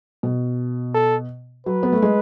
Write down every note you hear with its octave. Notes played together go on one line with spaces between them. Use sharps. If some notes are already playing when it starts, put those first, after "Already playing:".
B2
A4
F#3 B4
B3
A3
G#3